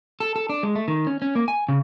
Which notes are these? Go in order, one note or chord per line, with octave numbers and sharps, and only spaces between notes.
A4
A4
D4
G#3
A3
D#3
C#4
C#4
A#3
G#5
C#3